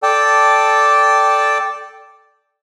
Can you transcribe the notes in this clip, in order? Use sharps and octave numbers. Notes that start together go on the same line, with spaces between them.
A4 D5 G5 A5